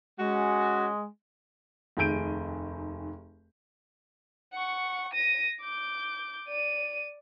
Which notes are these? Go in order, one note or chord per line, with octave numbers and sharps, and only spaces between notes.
G#3 C#4 F#4
F1 D#2 G#4 G6 D7 D#7
F#5 C#6
A#6 D#7
D6 G6
D5 D#7